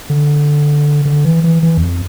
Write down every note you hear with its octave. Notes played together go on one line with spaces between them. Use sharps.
D3
D3
E3
E3
E3
E2
F2